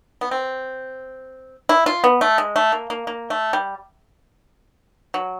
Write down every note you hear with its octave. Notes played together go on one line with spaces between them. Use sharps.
B3
C4
E4
F4
B3
A3
G#3
A3
A#3
A#3
A#3
A3
G3
F#3